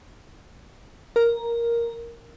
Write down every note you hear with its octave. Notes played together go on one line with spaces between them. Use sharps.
A#4